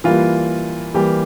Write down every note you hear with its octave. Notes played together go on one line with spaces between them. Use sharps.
E3 G3 A#3 F4
E3 G3 A#3 G4